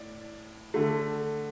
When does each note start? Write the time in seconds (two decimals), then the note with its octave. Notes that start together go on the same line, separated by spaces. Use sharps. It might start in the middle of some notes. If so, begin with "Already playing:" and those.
Already playing: A2 D5
0.74 D3 A3